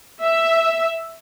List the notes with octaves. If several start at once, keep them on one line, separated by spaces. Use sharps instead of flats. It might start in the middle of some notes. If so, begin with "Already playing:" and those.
E5